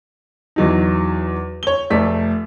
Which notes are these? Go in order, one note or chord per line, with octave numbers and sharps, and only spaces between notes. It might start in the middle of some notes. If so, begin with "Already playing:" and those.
E2 F#3 D#4
C#5 G7
F1 A3 D5 B6